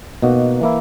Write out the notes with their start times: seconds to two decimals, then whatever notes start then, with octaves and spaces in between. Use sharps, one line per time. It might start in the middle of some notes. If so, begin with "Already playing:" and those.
0.22 B2 A#3 D#4 F#4
0.61 E3 A#3 E4